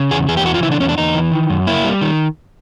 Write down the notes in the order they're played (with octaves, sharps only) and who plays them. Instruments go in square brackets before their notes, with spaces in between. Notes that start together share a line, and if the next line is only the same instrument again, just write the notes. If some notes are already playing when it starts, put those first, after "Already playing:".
Already playing: [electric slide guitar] C#3
E2 G#4
E2 G#4
G4
E3 F#4
F4
C#3 E4
D4
E2 C#4
D4
E2 D#4
E3
D#3
F#2
A#3 E4
G3
D#3